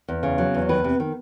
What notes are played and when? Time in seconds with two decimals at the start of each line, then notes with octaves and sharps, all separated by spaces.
0.08 E2
0.23 C#3
0.38 F#3
0.54 E2
0.69 D#3 B4
0.84 C3
1.00 D#3